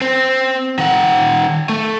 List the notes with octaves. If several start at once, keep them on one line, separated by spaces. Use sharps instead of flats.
C4
D#3 F#5
A3